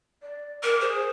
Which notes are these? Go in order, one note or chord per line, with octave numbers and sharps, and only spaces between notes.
D5
A#4 D6
G#4 C5